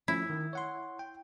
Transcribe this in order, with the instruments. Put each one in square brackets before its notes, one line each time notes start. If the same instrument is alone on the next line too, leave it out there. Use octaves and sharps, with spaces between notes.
[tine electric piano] F3 A3 C#4 [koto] E4
[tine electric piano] D#3
C#5 F#5 C6
G5